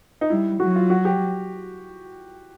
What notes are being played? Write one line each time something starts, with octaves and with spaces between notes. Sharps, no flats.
D#4
G3 E4
F#3 F#4
F4
F#4
G4